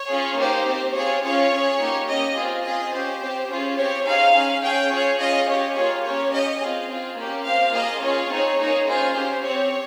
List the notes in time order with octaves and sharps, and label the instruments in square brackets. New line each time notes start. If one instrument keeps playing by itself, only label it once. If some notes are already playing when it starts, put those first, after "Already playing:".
Already playing: [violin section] C#5
C#4 F4 G#4
A#3 D#4 G4 C5
C4 G4
C4 F4 G#4 C#5
C#4 F4 G#4 C#5
C#4 G#4
A#3 D#4 G4
A#3 C#4 G4 D#5
C4 F4 G#4
C4 F4 G#4 D#5
C#4 G4 C5
C4 G4
C#4 F4 G#4
C4 G4 C#5
C4 D#4 G#4 F5
C#4 G#4
C#4 G#4 G5
C#4 F4 G#4 C#5
C#4 F4 G#4 D#5
C#4 G4 C#5
A#3 F4 G#4 C#5
A#3 C#4 G4 C#5
C#4 G4 D#5
C4 F4 G#4
C4 F4 G#4
A#3 C#4 G4
C4 G4 F5
A#3 F4 G#4 D#5
C#4 F4 G#4 C#5
C4 D#4 G#4
A#3 D#4 G#4
C#4 F4 G#4 C5
C#4 G4
C4 G4 C#5